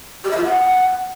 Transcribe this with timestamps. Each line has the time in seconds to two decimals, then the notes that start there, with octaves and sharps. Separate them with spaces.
0.24 G4
0.31 E5
0.38 F4
0.44 F#5